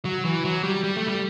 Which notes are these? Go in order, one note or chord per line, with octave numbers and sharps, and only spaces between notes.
F#3
E3
F#3
G3
G3
A3
G3